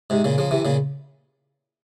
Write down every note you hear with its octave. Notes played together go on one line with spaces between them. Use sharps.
G#2 C3
A#2 C#3
C#3 F3
C3 E3
A#2 C#3